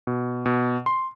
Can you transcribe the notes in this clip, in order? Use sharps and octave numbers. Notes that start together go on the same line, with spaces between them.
B2
B2
C6